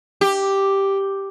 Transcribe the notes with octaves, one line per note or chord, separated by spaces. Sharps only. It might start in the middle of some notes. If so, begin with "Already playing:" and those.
G4